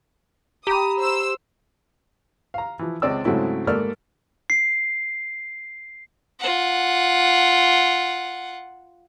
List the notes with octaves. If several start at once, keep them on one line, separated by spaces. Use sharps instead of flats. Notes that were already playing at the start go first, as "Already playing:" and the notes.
G4 A#5 B5 D#6
C5 E6
F5 A#5
E3 F3
C#2 G#3 C4 D5 E6
G#2 C#3 F#3 A3 C4 E4
G#2 A3 A#3 A4 D5 F6
C7
F4 F#5